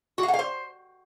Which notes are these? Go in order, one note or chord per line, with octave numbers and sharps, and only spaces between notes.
F#4
F5
F#5
F5
C5